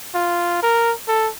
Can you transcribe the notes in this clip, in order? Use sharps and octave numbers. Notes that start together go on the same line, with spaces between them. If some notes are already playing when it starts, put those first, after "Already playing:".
F4
A#4
A4